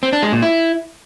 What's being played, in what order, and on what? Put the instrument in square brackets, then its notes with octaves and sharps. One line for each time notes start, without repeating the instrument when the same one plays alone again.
[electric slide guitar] C4
D4
G#3
A#2
E4